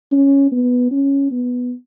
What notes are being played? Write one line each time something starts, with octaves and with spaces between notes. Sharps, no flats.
C#4
B3
C#4
B3